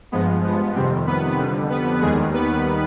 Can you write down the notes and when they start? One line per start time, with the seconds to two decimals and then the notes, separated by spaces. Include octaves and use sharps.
0.12 G2 F3 G#3 B3
0.44 B3
0.75 F2 C3 D#3 G3 C4
1.07 B3 B4
1.38 F2 D3 G3
1.70 B3 B4
2.02 D#2 D#3 G3 G#3 G#4
2.34 B3 B4